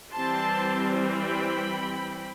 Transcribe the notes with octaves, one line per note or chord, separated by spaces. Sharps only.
E3 G3 C4 A5 C6
G5 B5